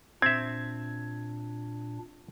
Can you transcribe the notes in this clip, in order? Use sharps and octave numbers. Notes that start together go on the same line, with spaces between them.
A#2 C4 D4 E5 G#6